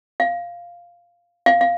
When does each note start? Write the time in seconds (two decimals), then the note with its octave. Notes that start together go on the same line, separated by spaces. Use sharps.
0.20 F5
1.46 F5
1.61 F5